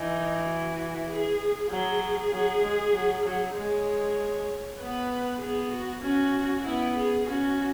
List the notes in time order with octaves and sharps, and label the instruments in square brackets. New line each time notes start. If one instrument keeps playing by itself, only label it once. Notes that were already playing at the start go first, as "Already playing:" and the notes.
Already playing: [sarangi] E3 [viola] D#4
[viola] F#4
G#4
[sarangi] F#3 [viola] G#4
[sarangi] F#3
G#3
F#3
F#3
[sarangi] G#3 [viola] C#5
[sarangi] B3 [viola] B4
[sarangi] B3 [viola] G#4
[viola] F#4
[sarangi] C#4 [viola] F#4
[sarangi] B3 [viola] E4
[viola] G#4
[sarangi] C#4 [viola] F#4